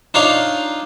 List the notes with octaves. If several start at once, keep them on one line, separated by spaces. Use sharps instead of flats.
D4 D#4 F4 C#5 F5